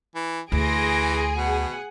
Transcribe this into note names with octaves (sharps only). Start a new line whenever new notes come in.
E3
D2 E3 G#4 C6 A#6 D7
B2 F#5